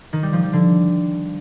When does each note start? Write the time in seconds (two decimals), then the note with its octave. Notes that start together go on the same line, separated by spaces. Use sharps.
0.13 D#3
0.23 G3
0.33 F3
0.43 G3
0.53 D3